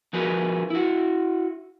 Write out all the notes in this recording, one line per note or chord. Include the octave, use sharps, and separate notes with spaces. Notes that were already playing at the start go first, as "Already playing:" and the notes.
F3 F#4 G#4 A#4 B4
E4 F#4